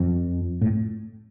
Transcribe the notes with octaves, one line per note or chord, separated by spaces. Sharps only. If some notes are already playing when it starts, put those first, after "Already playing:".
Already playing: F2
A2